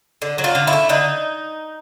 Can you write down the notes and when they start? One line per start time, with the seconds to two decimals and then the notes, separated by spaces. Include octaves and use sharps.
0.22 D3
0.38 F#3
0.44 F4
0.55 D3
0.67 E4
0.73 A3
0.89 D3 D#4